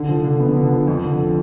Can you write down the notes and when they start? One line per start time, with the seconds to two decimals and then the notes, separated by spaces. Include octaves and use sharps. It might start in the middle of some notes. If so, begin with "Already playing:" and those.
Already playing: D3
0.08 F3
0.24 D3
0.40 B3
0.56 D3
0.72 F3
0.87 F2
1.04 D3